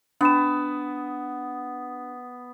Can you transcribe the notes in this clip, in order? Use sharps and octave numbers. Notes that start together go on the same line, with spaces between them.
B3 D4 E7